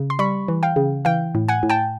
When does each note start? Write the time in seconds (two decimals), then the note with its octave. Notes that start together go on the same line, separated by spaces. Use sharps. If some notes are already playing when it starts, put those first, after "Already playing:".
Already playing: C#3
0.10 C6
0.19 G3 B5 C#6
0.48 E3
0.63 F5 G5
0.76 C#3
1.05 E3 F5 G5
1.35 A2
1.48 F#5 G#5
1.63 A2
1.70 G5 A5